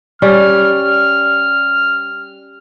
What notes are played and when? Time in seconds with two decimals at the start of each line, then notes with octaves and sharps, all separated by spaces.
0.22 G3 C#4 F6